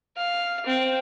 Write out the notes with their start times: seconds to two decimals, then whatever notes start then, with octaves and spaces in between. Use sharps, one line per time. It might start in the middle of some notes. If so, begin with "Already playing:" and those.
0.17 F5
0.66 C4